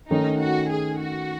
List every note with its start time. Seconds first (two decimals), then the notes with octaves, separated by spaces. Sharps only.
0.10 D#3 A3 C#4 D#4
0.41 F#4
0.71 G#4
1.00 F#4